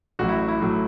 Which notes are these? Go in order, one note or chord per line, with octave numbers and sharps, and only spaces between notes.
A1 A2 F#3 F#4
E4
E4
A2 F#3